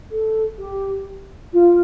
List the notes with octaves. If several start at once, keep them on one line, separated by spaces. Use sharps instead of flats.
A4
G4
F4